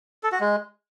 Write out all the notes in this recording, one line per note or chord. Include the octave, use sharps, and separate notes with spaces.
A4
F#4
G#3